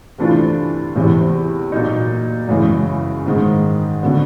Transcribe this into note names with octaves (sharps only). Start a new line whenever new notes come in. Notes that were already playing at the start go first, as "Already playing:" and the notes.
C3 E3 A3 D4 F4
E2 C3 E3
A#2 F#3 A#3 D#4
F#2 C#3 E3 G#3
G#2 D#3 G#3
D3 F#3 B3